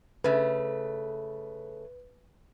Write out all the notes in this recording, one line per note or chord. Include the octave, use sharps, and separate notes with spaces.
C#3 A3 B4